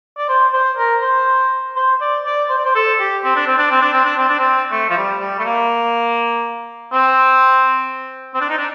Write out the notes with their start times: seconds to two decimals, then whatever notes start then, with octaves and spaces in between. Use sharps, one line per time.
0.18 D5
0.29 C5
0.53 C5
0.78 A#4
1.02 C5
1.76 C5
2.01 D5
2.26 D5
2.50 C5
2.58 D5
2.65 C5
2.75 A4
2.99 G4
3.24 C4
3.36 D4
3.47 C4
3.58 D4
3.71 C4
3.81 D4
3.93 C4
4.05 D4
4.17 C4
4.29 D4
4.40 C4
4.71 A3
4.90 F3
4.97 G3
5.20 G3
5.39 A3
5.45 A#3
6.93 C4
8.34 C4
8.41 D4
8.50 D#4
8.57 D4